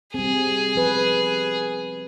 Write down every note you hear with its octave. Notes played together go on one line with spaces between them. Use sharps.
G3 C4 G#4
F3 B4